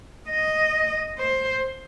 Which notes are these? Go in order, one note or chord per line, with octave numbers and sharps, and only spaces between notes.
D#5
C5